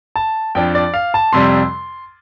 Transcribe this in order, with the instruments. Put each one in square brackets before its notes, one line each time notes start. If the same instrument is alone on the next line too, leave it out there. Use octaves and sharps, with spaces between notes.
[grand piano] A5
F2 F3 D4 G5
D5
F5
A5
F2 C3 G3 C6